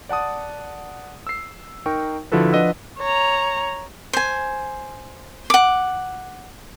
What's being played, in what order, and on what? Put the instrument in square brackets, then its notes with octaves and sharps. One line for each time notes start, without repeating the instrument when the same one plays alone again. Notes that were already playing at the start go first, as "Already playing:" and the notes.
[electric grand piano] D5 F#5 A5 D#6
E6 C7
D#4 A#4 G5 C#6
D3 F3 E4 F#4 A4 B4
F3 D4 B4 D#5 F#5 E6
[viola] C#5 A#5
[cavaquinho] C5 G#5
F#5 D6